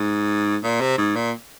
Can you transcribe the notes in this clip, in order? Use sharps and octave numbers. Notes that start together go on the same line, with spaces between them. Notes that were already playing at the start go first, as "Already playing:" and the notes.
Already playing: G#2
A#2
C3
G#2
A#2